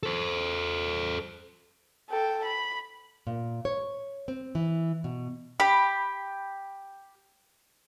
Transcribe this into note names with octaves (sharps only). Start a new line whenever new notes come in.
A4 C5
A4 G5
B5
A#2
C#5
C4
E3
B2
G4 B5